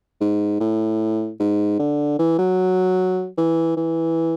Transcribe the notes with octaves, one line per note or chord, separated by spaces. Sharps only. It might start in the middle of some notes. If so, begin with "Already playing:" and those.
G#2
A2
G#2
D3
E3
F#3
E3
E3